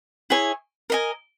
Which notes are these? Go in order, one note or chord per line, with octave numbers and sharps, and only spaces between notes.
E4 G#4 C#5 G#5
A#4 D#5 G#5